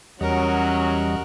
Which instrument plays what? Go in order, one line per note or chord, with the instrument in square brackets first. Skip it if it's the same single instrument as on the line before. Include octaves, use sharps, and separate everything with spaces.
[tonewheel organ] E2 G3 D#5 [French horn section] F#3 C#4 [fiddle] F#4 A#4